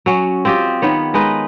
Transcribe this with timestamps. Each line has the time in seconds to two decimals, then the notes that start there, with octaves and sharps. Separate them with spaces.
0.06 F#3 C#4
0.45 C4 F4 G4 D#5
0.82 D#3 B3 C#5
1.14 G#3 D#4 B4 D#5